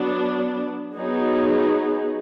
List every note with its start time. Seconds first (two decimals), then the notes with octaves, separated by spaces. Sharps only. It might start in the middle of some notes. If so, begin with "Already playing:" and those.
Already playing: F#3 B3 D4
0.94 F#3 B3 D#4 G#4